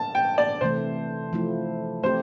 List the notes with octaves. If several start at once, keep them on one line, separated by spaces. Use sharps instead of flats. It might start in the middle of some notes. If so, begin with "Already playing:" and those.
Already playing: A5
G5
D5
C3 E3 A3 C5
F3 A3 E4
A3 C4 G4 C5